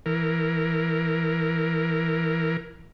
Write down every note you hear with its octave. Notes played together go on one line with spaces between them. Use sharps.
E3 A#4